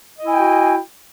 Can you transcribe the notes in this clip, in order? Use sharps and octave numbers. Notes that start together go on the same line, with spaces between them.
E4 F#4 D#5 G5 G#5